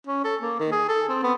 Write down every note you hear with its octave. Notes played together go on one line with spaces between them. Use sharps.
C#4
A4
A#3
D#3
G#4
A4
C4
B3